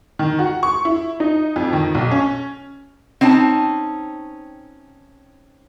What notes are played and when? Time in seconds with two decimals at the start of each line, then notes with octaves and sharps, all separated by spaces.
0.19 D#3
0.39 F#4
0.63 C#6
0.85 E4
1.20 D#4
1.56 F2
1.73 D#3
1.95 B1
2.11 C#4
3.21 C4 C#4 D#4 A5